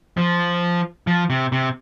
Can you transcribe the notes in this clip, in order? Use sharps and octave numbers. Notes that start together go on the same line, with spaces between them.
F3
F3
C3
C3